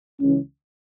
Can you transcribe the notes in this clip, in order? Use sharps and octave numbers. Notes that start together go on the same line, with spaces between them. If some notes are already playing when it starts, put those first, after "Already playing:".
C#2 C#3 E3 C#4